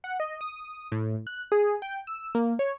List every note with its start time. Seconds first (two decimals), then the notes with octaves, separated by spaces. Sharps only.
0.04 F#5
0.20 D#5
0.41 D#6
0.92 A2
1.27 F#6
1.52 G#4
1.82 G5
2.07 E6
2.35 A#3
2.59 C#5